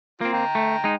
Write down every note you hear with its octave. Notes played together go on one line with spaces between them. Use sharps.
A#3 C4 F4
G5 A#5
A3
G#3 D#4